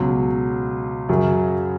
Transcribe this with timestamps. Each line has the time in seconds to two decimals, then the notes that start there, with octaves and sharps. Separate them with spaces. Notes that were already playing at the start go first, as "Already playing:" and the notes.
Already playing: C#2 B2 F#3
1.09 F#2 C#3 F#3 C#4